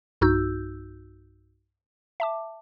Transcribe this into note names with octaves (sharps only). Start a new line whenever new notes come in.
B1 G2 D#4 F#4 E6 G6
E5 A5 D6